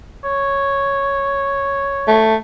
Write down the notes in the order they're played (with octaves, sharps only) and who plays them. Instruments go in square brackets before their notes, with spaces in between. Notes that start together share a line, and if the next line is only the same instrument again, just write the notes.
[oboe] C#5
[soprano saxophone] A3